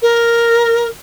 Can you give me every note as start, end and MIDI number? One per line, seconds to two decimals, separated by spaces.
0.02 0.87 70